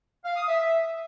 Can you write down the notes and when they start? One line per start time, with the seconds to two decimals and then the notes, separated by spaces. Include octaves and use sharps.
0.25 F5
0.36 D#6
0.48 E5